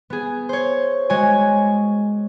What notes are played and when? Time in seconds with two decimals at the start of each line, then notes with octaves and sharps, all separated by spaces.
0.10 B3 G#4
0.49 C5 C#5
1.10 G#3 F#4 C#5 G#5